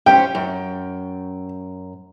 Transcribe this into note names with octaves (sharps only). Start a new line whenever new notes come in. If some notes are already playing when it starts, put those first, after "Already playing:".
C#4 G4 C5 G5
F#2